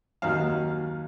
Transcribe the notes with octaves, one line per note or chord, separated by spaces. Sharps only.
D#2 D#3 F#3 F5